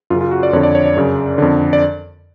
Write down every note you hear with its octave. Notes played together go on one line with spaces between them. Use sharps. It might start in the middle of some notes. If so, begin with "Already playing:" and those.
F#2 C#3 F4
F4
F#4
D5
F2 D3 C#5
D5
C#5
D5
F#2 C#3
F2 D3
D5